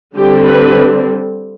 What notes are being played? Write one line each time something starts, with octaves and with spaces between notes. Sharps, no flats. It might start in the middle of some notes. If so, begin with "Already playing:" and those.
D3 G3 C4 G4
B4